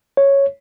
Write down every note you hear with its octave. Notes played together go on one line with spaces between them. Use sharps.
C#5